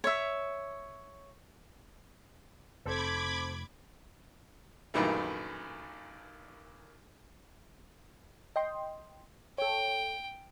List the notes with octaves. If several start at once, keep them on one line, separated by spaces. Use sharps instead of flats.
C#5 E5
F1 C4 A4 C5 B5 D6 G#6
A#1 F#2 D#3 E3 G3 A3
D#5 G5 C6
A4 C#5 G5